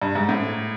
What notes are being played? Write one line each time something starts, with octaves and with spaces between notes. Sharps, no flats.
G2
G#2
A2